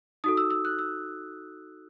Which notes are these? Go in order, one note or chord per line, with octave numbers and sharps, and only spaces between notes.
D#4 F#4 A4 D#6
E6
E6
F#6
E6